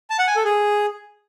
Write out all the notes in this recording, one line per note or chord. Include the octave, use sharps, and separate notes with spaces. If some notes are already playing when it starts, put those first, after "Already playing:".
A5
F#5
G#5
A4
G#4